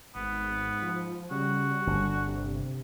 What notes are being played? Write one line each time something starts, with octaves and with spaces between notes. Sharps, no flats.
G#1 G#2 B3
F3
C#3 G3 F#4
G1 D3
C3